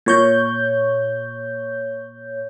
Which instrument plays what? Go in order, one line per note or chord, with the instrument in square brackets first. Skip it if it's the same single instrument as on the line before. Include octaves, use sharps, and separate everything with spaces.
[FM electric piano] A#2 C#5 G6